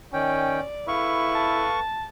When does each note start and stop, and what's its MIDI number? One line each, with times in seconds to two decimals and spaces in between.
0.13 0.60 51
0.13 0.64 61
0.13 0.87 74
0.13 0.60 79
0.88 1.69 64
0.88 1.78 69
0.88 1.78 71
0.88 1.78 77
0.88 1.80 85
1.35 2.06 81